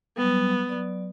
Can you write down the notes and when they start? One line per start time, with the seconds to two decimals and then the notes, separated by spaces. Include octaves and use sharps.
0.17 F#3 G3 B3
0.69 F#3 D5